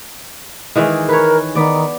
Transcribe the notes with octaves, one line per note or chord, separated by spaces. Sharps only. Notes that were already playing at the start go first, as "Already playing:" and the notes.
D#3 E3 G#3
A#4 B4 C#5
D#3 B3 D5